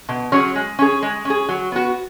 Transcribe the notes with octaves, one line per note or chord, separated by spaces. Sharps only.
B2
F#3 C#4 G#4 C#5
G#3
C#4 G#4
G#3
C#4
G#4
F#3
B3 F#4